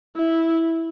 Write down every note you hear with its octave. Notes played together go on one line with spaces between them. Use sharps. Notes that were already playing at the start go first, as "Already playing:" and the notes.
E4